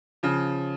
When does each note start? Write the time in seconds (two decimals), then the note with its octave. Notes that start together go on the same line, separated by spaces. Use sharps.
0.23 C#3 F3